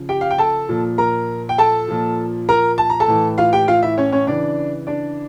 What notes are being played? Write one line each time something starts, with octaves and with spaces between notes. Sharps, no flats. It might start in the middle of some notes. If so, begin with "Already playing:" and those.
Already playing: C#3 F3
G4 G5
F5
G5
A4 A5
A#2 F3
A#4 A#5
G5
A4 A5
A#2 F3
A#4 A#5
A5
A#5
A4 A5
A2 E3
F4 F5
G4 G5
F4 F5
E4 E5
C#4 C#5
C#4 C#5
C#3 E3 D4 D5
D4 D5